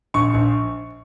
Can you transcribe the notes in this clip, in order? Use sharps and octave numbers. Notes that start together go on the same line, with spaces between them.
A#1 C#6
A#1